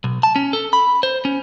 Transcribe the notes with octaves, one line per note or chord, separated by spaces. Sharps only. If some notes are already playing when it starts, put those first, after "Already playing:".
B1
A5
C#4
A4
B5
C5
C#4